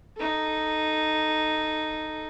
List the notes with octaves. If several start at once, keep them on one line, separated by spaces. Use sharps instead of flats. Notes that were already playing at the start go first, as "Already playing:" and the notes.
D#4 A4